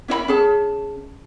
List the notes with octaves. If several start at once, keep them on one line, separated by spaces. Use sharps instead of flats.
C#4 E4 D#5 B5
C#4 G#4 A5